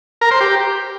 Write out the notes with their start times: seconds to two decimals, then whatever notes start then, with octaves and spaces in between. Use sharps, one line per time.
0.21 A#4
0.31 C5
0.41 G4